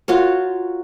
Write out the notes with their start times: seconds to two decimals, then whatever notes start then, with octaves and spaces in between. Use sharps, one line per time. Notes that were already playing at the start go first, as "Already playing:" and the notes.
0.08 F4 F#4 A#4 C#5